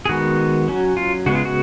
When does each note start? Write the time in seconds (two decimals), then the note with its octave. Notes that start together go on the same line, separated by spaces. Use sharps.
0.05 G#4
0.09 D#3 G#3 B3 F#4
0.68 F#3 C#4
0.97 F4
1.26 C#3 G#3 B3 F#4
1.35 F4
1.45 F#4